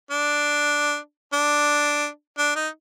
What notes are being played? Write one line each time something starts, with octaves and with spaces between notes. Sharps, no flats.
D4
D4
D4
D#4